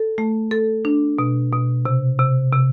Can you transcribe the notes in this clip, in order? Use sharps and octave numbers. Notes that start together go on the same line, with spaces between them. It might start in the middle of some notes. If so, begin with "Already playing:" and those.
Already playing: A4
A3
A4
D4
B2
B2
C3
C3
C3